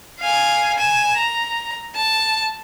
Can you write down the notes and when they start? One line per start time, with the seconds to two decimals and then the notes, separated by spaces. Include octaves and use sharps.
0.20 F5 G#5
0.78 G#5 E7
1.17 A#5
1.95 A5